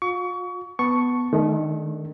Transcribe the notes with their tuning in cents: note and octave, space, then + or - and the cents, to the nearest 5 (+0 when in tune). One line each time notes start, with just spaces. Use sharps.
F4 +40 C#6 +30
B3 +0 A5 +0 C#6 +0
D#3 -10 A3 -35 D4 -10